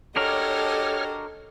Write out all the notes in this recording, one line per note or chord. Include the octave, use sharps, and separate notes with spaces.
D4 F#4 G4 A4 A#4 C#5 D#5 F6